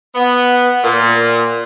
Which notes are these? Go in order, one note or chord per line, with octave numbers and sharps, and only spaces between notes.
B3
A#2